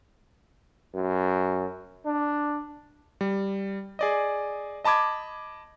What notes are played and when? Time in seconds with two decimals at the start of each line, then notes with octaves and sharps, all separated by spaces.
0.95 F#2
2.06 D4
3.21 G3
3.99 G#4 D5 D#5
4.84 D#5 A5 B5 D6 G#6